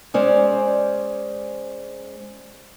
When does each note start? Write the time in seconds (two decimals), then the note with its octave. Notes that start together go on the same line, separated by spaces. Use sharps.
0.14 G#3 C#4 C5 D5